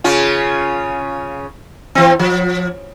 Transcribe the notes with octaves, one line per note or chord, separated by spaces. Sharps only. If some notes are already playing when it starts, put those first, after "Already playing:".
C#3 C#4 F4
E3 C4
F3